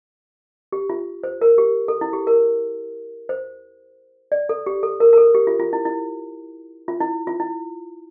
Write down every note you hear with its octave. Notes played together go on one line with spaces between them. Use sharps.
G4
F4
C5
A#4
G4
A4
E4
G4
A#4
C5
D5
A4
G4
A4
A#4
A#4
A4
G4
F4
F4
E4
E4
F4
E4
F4
E4